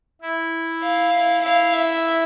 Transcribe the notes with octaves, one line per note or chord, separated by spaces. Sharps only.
E4
F5
E4
E4 F5
E5